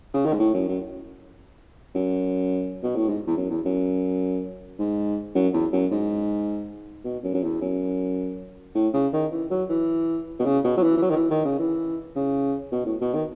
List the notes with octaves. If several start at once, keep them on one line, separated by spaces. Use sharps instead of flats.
C#3
D#3
G#2
A2
F#2
F#2
F#2
B2
A2
G#2
E2
F#2
E2
F#2
G#2
F#2
E2
F#2
G#2
B2
F#2
F#2
E2
F#2
A2
C#3
D#3
E3
F#3
E3
B2
C#3
B2
F#3
E3
E3
F#3
D#3
E3
D#3
C#3
E3
C#3
B2
A2
B2
D#3